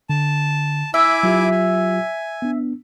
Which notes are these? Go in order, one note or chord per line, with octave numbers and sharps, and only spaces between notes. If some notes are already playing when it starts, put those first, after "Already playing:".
D3 A5
E4 E5 G#5 D6
F#3 F4 G4
G#5
B3 D4